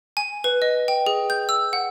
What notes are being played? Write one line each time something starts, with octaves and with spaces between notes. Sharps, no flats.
G#5
B4
D#5
G5
G#4
G6
E6
F#5